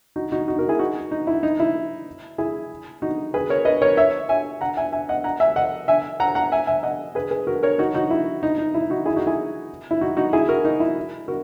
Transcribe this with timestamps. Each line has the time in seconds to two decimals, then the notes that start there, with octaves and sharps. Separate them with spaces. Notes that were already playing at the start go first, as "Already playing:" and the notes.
0.16 D#4 F#4
0.32 D#4 F#4
0.48 D#4 F#4
0.58 F#4 A#4
0.69 E4 G#4
0.79 D#4 F#4
1.11 D#4
1.27 E4
1.43 D#4
1.60 E4
2.38 E4 G#4
3.02 D#4 F#4
3.34 G#4 B4
3.50 A#4 C#5
3.65 B4 D#5
3.82 A#4 C#5
3.97 C#5 E5
4.29 E5 G#5
4.61 F#5 A#5
4.77 E5 G#5
4.92 E5 G#5
5.09 D#5 F#5
5.24 F#5 A#5
5.40 E5 G#5
5.56 D#5 F#5
5.88 E5 G#5
6.20 F#5 A#5
6.35 F#5 A#5
6.52 E5 G#5
6.67 E5 G#5
6.83 D#5 F#5
7.15 G#4 B4
7.31 G#4 B4
7.47 F#4 A#4
7.63 A#4 C#5
7.79 D#4 F#4
7.94 D#4 F#4
8.10 E4
8.43 D#4
8.58 D#4
8.74 E4
8.90 D#4 F#4
9.05 E4 G#4
9.16 D#4 F#4
9.27 E4 G#4
9.91 E4
10.01 D#4 F#4
10.17 D#4 F#4
10.33 E4 G#4
10.49 F#4 A#4
10.65 D#4 F#4
10.80 E4
11.28 F#4 A#4